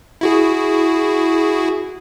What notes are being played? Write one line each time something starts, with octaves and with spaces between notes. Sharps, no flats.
E4 F#4 G#4